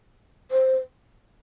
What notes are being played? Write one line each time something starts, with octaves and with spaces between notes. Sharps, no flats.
C5